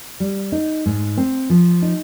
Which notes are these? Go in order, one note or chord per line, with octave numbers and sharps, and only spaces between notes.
G3
D#4
G#2
C4
F3
D#4